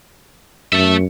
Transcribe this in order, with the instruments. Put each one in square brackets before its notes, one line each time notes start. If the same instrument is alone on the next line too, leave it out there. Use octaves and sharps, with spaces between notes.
[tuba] F#2 [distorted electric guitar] A3 E5